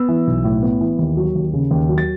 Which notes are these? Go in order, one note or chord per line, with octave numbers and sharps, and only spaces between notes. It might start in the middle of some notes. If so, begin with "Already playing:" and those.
Already playing: B3 E6
E3
B1
A2
B3
E3
D#2
F#3
D#2
C#3
D#2
F#3
A6